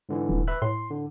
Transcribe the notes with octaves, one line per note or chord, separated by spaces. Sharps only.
G#2 D3 E3
D#1
B4 E5 F#6
A2 C6
D3